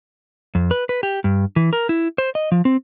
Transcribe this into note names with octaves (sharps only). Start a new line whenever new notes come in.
F2
B4
B4
G4
G2
E3
A#4
E4
C5
D#5
F3
C4